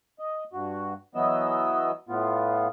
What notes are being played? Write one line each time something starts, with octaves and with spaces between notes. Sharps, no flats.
D#5
G2 F#4
E3 F#3 B3 D#5 E6
A2 B3 F4